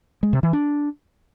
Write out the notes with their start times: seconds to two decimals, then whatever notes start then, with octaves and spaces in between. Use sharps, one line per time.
0.23 G#3
0.33 C3
0.43 E3
0.53 D4